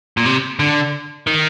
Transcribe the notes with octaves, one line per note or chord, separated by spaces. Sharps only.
A#2
C3
D3
D#3